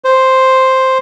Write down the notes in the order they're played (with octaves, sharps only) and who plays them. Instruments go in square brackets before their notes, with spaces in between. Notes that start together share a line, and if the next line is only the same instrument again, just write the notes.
[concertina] C5